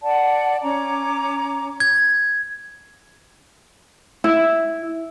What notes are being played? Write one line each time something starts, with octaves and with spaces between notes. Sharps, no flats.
D5 F#5 A5
C#4 A#5 D6
G#6
E4